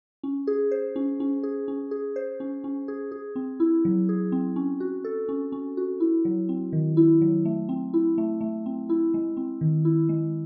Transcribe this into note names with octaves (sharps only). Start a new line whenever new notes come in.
C#4
G#4
C5
C#4
C#4
G#4
C#4
G#4
C5
C#4
C#4
G#4
G#4
C4
E4
F#3
G#4
C4
C#4
F#4
A4
C#4
C#4
F#4
E4
F#3
C4
D#3
E4
F#3
A3
C4
E4
A3
A3
C4
E4
G#3
C4
D#3
E4
G#3